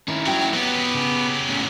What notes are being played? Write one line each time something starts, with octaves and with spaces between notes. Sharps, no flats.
D#3 C#4 E4
F#3 F#4 G5
F#3 B3 G4
C#3
A2 C#4